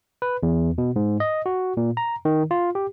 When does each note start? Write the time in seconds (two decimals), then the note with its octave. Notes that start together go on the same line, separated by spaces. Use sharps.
0.22 B4
0.43 E2
0.78 B2
0.96 G#2
1.20 D#5
1.46 F#4
1.77 A#2
1.97 A#5
2.25 D#3
2.51 F4
2.75 G4